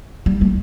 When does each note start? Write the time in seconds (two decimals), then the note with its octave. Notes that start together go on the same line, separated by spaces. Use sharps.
0.26 G3
0.41 A3